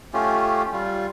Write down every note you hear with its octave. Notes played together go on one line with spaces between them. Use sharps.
A3 C#4 F4 G4
G3 F4